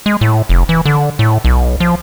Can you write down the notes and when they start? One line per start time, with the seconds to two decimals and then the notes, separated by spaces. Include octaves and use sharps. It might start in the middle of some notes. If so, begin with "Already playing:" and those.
0.06 G#3
0.21 A2
0.49 F1
0.69 E3
0.85 D3
1.19 A2
1.45 B1
1.80 F3